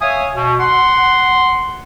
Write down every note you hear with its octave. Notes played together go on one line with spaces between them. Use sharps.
C#5 E5 F5 G#5 D#6
B2
F#5 C6